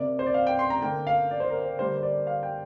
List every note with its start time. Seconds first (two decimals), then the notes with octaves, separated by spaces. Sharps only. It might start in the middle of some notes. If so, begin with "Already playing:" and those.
Already playing: C3 A#3 D5
0.19 C5
0.26 D5
0.34 F5
0.47 G5
0.59 C6
0.70 A#5
0.82 D3 A#3 G5
1.07 F5
1.31 D5
1.40 C5
1.50 A#4
1.59 C5
1.79 D3 G3 A#3 C5
1.98 C5
2.03 D5
2.27 F5
2.43 G5